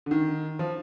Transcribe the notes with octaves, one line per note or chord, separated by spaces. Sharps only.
D3
D#3
F3